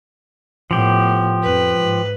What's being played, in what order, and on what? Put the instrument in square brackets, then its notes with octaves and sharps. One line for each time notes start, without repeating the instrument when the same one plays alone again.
[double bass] A2 B3 [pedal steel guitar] F3 G4
[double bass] F2 [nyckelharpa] B4
[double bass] G#2